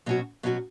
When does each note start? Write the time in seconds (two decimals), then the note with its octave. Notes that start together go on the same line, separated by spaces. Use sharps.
0.06 B2 F#3 C#4 F#4
0.43 B2 F#3 C#4 F#4